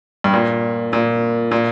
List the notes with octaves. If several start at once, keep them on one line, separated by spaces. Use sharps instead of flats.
G2
A#2
A#2
A#2